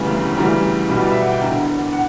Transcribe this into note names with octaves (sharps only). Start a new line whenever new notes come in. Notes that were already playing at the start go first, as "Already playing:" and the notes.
Already playing: E1 D2 C#3 E3 G3 A#5
D2 C#3 E3 G3 A#5
B1 B2 G3 B5
D5
E5
F#5
G5
E1 E2 D3 A#5
F#5